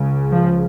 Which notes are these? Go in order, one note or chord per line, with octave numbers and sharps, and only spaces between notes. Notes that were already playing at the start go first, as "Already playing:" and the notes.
Already playing: C#2 C#3
F3